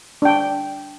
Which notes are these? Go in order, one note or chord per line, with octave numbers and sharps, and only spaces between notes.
D4 G5